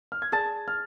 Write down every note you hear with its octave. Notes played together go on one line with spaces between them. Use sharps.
F6
G#6
G#4 D5 A5 A6
F6